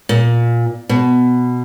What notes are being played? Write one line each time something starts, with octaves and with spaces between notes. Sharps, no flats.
A#2
B2